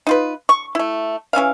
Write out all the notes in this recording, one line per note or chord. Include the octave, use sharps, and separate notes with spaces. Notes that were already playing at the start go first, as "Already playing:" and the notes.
D#4 F4 B4
C#6
A3 E4
E3 C#4 E5 F5